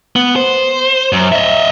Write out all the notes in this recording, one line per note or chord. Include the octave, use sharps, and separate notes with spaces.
B3
C5
F#2
D#5 E5